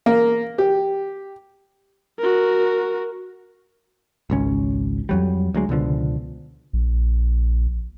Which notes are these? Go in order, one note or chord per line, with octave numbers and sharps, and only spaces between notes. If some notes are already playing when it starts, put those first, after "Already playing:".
A#3
G4
F#4 A#4
G#1 C#2 C#4
F2 F#3 G3
D2 F#3 G#3
C#2 B2 D3 F3
A#1